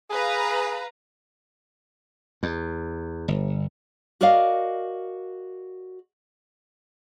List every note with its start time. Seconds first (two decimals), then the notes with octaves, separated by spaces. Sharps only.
0.10 G#4 B4 F5 A#5
2.43 E2
3.28 G1
4.21 F#4 A#4 D5 D#5 F5